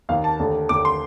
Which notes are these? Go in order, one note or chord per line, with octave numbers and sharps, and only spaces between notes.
D#2 D#3 A#3 F5
A5
D#2 D3 A3
D#2 D3 A3 D6
C6